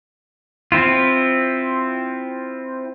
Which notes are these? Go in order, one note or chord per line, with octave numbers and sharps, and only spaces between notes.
C4 E4 F4